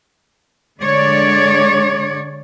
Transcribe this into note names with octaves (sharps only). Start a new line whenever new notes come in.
D3 G#3 C#5 D5